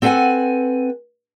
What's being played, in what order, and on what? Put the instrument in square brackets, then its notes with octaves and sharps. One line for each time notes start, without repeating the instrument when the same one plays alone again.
[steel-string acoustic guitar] C4 A4 B4 E5 F#5 G#5